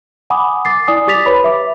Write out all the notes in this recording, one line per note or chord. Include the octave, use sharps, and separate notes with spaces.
F#5 G#5 B5 D6 D#6
D6 A6 C7
E4 D5 G#5 D#6
G4 D6 A6 B6 F7
B4 C#5 B5
E5 D6